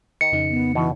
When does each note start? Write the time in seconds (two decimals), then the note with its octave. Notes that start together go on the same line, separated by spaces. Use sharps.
0.21 D#3 C#7
0.32 F2 C#3 D#4
0.51 B3
0.75 B2 E3